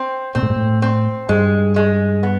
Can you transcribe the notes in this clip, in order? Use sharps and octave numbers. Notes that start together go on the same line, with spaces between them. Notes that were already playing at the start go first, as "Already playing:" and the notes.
Already playing: C4
A#2 C4
A2
G#2
A2
C4
G2 G#3
G#3
B3